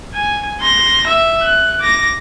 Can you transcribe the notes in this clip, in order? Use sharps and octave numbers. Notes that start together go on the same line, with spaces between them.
G#5
C6 A#6
E5
F#6
D6 A#6